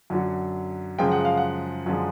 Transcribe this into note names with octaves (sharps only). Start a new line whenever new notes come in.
F#2 D3 F#3
F#2 C#3 F3 G#3 G5
F#5
F5
F#5
F#2 D3 F3 G#3